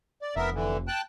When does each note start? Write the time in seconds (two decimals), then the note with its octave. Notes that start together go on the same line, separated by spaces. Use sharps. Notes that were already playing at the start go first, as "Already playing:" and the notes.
0.22 D5
0.36 F1 B3 A#4 E5
0.54 D3 E3
0.88 G5 A5 F#6